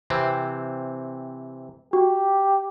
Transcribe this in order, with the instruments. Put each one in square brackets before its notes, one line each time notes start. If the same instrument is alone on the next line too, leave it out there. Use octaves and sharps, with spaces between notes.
[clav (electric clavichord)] C3 E3 C4
[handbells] F#4 [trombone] G4